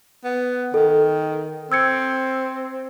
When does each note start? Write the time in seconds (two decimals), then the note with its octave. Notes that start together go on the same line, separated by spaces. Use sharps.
0.24 B3
0.74 D#3 A4
1.72 C4 E6 G#6 C#7